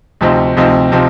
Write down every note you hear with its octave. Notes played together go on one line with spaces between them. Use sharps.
D2 C3 F3 C4 D#4
D2 C3 F3 C4 D#4
C3 F3 C4 D#4